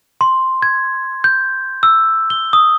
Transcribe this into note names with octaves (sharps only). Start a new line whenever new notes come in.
C6
G#6
G6
E6
G7
D#6